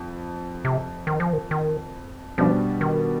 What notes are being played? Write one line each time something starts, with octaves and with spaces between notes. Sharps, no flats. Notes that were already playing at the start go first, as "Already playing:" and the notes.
Already playing: F2
C3
D#3
F3
D#3
D#3
B2 F3 G3 D4
D#3